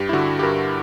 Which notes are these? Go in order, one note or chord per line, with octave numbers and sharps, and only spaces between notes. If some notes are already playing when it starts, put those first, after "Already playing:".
Already playing: G2 G4
E4
D3 F#4
G4
G2 A#4